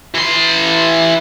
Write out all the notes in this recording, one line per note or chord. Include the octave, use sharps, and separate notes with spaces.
E3 C6